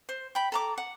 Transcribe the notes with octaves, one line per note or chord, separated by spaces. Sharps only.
C5
G5 B5
A4 A#5 D6
F#5